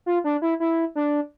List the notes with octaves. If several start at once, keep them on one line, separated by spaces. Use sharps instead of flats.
F4
D4
E4
E4
D4